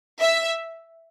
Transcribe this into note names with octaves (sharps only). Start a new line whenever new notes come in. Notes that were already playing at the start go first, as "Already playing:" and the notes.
E5